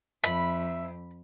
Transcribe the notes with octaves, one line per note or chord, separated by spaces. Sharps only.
F2 E5 B5